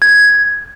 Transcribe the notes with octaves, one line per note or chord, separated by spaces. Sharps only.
G#6